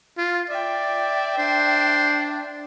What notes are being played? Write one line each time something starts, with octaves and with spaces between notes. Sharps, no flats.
F4
D5 E5 G5
D4 C5